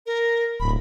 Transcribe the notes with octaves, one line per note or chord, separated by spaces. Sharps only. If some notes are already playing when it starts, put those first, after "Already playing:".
A#4
D1 B5